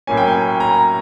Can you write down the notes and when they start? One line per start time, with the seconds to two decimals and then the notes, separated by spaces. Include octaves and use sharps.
0.07 A2 F#3 A#3 C#4 G#5
0.17 G5
0.27 G#5
0.60 A#5